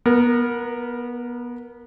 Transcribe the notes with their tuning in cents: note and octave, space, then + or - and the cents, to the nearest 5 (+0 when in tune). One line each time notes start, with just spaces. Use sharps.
B3 -25 A#4 +0